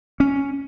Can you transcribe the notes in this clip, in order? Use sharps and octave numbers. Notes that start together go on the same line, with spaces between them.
C#4